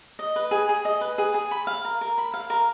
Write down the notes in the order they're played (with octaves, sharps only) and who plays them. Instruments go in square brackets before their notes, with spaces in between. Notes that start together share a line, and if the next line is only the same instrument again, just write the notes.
[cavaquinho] D#5
B4
G#4
G#4
D#5
B4
G#4
G#4
B5
F5
A#4
A#4
B5
F5
A#4